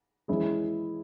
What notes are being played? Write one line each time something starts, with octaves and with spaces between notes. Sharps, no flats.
E3 G#3 C#4 E4 G#4